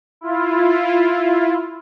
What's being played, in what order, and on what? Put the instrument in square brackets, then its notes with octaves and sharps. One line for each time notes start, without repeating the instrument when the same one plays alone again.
[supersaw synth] E4 F4